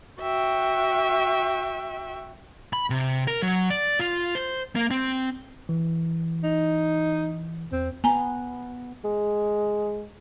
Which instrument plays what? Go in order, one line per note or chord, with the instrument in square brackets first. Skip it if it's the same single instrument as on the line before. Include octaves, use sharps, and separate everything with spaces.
[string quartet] F#4 E5 G5
[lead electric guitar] B5
C3
A#4
F#3
D5
F4
C5
A#3
C4
[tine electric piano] E3
[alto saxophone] D#4
[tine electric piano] E2 [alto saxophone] C4
[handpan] B3 [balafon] G#5 A#5
[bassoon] G#3